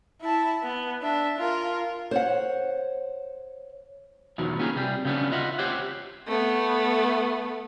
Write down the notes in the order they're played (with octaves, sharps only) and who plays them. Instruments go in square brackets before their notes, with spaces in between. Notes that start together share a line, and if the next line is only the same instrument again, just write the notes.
[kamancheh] E4 A5
B3
D4 E5
F4 A#4
[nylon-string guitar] C5 C#5 F#5
[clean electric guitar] E2 B2 D#3 F3 F#3
A#3 B3 C#4 F4 G#4 A#4
C3 G3 G#4
C#3 F#3 G#3 B3 C#4 D4
F4 D#5 E5 F#5
G4 C5 C#5 F#5
[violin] A3 B3